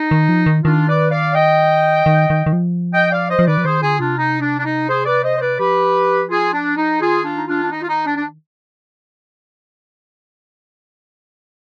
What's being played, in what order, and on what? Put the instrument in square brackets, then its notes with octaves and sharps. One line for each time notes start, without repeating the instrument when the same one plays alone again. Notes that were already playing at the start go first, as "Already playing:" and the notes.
Already playing: [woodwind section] D#4
[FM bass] D#3
F3
D#3
[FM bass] D#3 [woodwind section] D4 F4
[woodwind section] B4 D5
D5 F5
D#5 G5
[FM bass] D#3
D#3
D#3
F3
[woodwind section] D#5 G5
D5 F5
C5 D#5
[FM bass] F3
[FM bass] D#3 [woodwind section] B4 D5
[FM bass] F3
[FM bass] D#3 [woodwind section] G#4 C5
[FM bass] D3 [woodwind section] F4 G#4
[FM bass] C3 [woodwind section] D4 F4
[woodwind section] D#4
D4
D4
D#4
G#4 C5
B4 D5
C5 D#5
C5
B4 D5
[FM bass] F3 [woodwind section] G4 B4
[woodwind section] F4 G#4
D4
D#4
[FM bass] D#3 [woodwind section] F4 G#4
[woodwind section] D4 F4
D#4
D4 F4
D4
D#4
F4
D#4
D4
D4